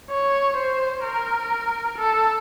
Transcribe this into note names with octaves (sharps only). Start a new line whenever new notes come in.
C#5
C5
A#4
A4